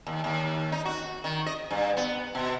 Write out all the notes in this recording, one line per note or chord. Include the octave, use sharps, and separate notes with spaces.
D#2
D#2
D#4
F#4
D#3
D#5
G2
B3
B2